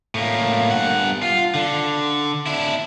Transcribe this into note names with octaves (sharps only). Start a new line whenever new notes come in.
A2 A#3
G2 F#5
F4
D3
D4 E4